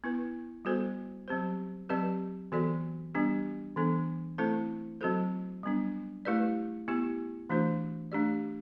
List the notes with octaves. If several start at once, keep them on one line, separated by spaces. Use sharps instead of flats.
B3 E4 B4
G3 B3 F#4 A4 C5
F#3 C4 G4 C5
F#3 C4 G4 B4 D5
E3 B3 F#4 A4 D5
G3 B3 D4 G4
E3 B3 D4 A4
A3 C4 E4 A4 C5
F#3 C4 F#4 A4 C5
G3 B3 D4
A3 E4 G4 B4 D5
B3 E4 G4
E3 A3 D4 F#4 C5
A3 D4 G4 D5